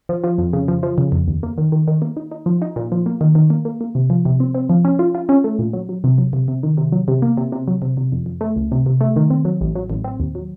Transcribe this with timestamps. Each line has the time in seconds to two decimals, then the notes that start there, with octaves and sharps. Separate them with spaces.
0.09 F3
0.24 F3
0.39 F2
0.53 C#3
0.68 F3
0.83 F3
0.98 C#3
1.12 F2
1.27 D#2
1.43 A#3
1.58 D#3
1.72 D#3
1.88 D#3
2.02 A#3
2.17 D#4
2.31 D#4
2.46 F3
2.62 D#4
2.76 A#2
2.92 F3
3.06 A#3
3.21 D#3
3.35 D#3
3.50 A#3
3.65 A#3
3.81 A#3
3.95 C3
4.10 F3
4.25 C3
4.40 C4
4.55 C4
4.70 F3
4.85 C#4
4.99 F4
5.15 F4
5.29 C#4
5.44 A3
5.59 A#2
5.73 F#3
5.89 F#3
6.04 C3
6.18 F#3
6.33 C3
6.48 C3
6.63 D#3
6.77 C3
6.92 F#3
7.08 C3
7.22 A#3
7.37 C3
7.52 C3
7.68 F#3
7.82 C3
7.97 C3
8.12 F2
8.26 F2
8.41 A3
8.56 C#2
8.72 C3
8.86 C3
9.01 A3
9.16 D#3
9.30 C4
9.45 F#3
9.61 A1
9.75 F#3
9.90 A1
10.04 C4
10.20 D#2
10.35 F#3